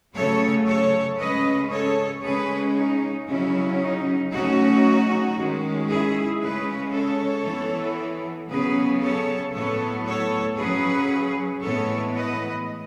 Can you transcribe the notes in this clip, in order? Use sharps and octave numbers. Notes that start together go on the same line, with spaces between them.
C#3 F#3 A3 A4 C#5
A4 C#5
C#3 G#3 C#4 B4 D#5
A4 C#5
C#3 G#3 C#4 G#4 B4
D#4
C#3 F#3 C#4 E4
D#4
C#3 F#3 A3 C#4 D#4 F#4
D#3 G#3 C#4
E4 G#4
C#3 G#3 C#4 G#4 B4
A4 C#5
E3 B3
C#3 F#3 B3 G#4 B4
A4 C#5
A2 F#3 B3 A4 C#5
A4 C#5
C#3 F#3 C#4 G#4 B4
A2 E3 G#3 B3 A4 C#5
B4 D#5